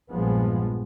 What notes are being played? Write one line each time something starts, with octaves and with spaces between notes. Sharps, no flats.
A#1 G2 F3 G#3 B3